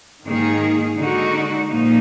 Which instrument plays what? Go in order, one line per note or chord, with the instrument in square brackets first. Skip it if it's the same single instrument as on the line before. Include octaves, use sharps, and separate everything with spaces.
[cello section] G#2 D#3 A#3 D#4 G#4
D3 G#3 D#4 F#4
A#2 F3 A#3 D#4